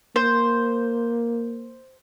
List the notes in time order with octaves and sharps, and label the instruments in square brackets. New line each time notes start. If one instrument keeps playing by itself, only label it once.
[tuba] A#3 [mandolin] C5